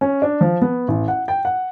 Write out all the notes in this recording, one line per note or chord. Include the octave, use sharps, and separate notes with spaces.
C#4
D4
F3
B3
A1
F#5
G5
F#5